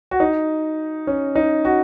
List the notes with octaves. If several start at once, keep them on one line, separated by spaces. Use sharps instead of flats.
F#4
D#4
C#4
D#4
F#4